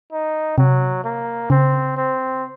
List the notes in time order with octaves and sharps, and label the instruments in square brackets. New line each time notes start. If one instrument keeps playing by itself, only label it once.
[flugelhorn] D#4
[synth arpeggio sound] C3 [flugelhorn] F#3
[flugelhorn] A#3
[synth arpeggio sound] C#3 [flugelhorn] C4
[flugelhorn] C4